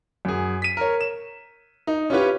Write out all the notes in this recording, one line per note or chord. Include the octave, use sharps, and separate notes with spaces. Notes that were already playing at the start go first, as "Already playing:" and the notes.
F#2 G#4
B6 D#7
A#4 C#5
E7
D#4
C#4 E4 F4 G4 B4 C#5